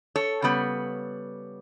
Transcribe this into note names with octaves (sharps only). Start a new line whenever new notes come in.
A4 C#5
C#3 G3 B3